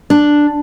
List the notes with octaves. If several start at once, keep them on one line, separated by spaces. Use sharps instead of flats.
D4